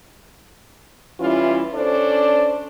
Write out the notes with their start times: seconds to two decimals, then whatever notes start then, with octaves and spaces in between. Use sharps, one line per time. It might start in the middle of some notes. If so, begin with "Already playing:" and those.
1.20 E3 G3 C#4 E4 F4
1.74 C#4 D4 A4 C5 D5